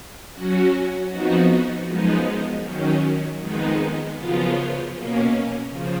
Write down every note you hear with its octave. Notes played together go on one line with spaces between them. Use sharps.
F#3 C#4 F#4
F2 F3 B3 D#4 F#4
F#2 F3 G#3 B3 D#4
D#3 F#3 C#4
F2 D#3 G#3 B3 D#4
F#2 C#3 F3 B3 F4
B2 A#3 C#4
C#3 F3